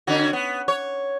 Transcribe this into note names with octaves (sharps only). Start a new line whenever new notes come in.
D3 C#4 F#4
B3
C#5